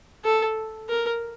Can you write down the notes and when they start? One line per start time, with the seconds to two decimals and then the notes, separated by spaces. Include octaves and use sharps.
0.24 A4
0.89 A#4